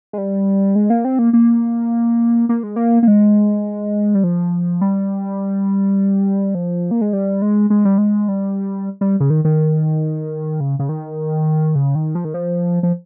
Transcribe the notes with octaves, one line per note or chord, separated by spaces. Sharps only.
G#3
G3
G#3
A#3
C4
A#3
A#3
A#3
G#3
A#3
A#3
G#3
G3
F3
G3
F3
A#3
G#3
G3
G#3
G#3
G3
G#3
G3
G3
C#3
D#3
D#3
C#3
C#3
D#3
C#3
D#3
F3
D#3
F3
F3